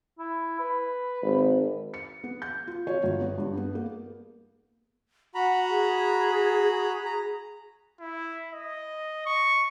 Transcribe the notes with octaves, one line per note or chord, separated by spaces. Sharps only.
E4
B4
G#1
C#7
B3
G6
F4
C#5
G1
B3
G2
B3
A#3
F#4 F#5 A#5 B5
G#4
A#5
E4
D#5
C#6